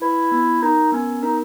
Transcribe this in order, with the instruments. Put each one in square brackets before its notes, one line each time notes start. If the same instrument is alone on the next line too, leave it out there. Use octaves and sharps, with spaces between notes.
[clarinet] E4 [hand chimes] B4
[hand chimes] B3
[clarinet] D#4 [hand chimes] A#4
[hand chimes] B3 [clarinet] C#4
[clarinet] D#4 [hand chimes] A#4